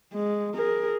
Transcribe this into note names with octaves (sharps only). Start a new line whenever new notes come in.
G#3
G#4 A#4